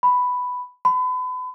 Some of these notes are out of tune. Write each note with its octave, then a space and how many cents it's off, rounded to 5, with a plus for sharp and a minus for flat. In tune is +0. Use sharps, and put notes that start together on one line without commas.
B5 +5
B5 +35